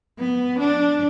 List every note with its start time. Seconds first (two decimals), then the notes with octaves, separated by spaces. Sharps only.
0.19 B3
0.60 D4